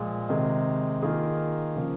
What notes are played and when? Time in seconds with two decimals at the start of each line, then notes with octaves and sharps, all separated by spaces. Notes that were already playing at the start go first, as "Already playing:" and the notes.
Already playing: A#2 F3 G#3
0.29 C3 D#3 G#3 D#4 G#4
1.03 D#3 A#3 F4 G#4
1.76 C#3 F3 A#3